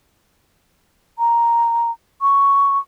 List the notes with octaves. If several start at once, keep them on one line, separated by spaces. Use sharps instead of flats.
A#5
C#6